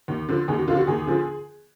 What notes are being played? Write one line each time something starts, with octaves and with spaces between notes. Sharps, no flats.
D#2
D3 F3
D#2 G#4
F#4
D3 F3 F4
F#4
D#2 G#4
D3 F3